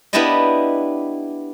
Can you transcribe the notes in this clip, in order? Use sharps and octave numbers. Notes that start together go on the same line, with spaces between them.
B3 D4 E4 G4 D5 D#5